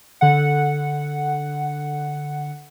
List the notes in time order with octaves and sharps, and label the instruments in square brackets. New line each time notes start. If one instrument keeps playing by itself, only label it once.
[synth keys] D3 F#5